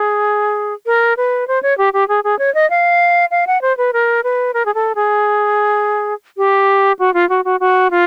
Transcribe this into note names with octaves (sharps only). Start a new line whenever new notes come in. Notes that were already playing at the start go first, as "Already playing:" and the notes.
Already playing: G#4
A#4
B4
C5
C#5
G4
G4
G#4
G#4
C#5
D#5
F5
F5
F#5
C5
B4
A#4
B4
A#4
G#4
A4
G#4
G4
F#4
F4
F#4
F#4
F#4
F4